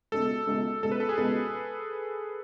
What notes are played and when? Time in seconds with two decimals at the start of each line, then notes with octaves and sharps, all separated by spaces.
0.12 C#2 B2 A3 A4
0.47 C#2 B2 A3
0.83 C#2 B2 A3 A4
0.92 B4
1.00 A4
1.09 G#4
1.18 C#2 B2 A3 A4